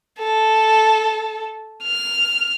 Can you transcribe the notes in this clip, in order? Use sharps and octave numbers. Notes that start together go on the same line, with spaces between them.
A4
F6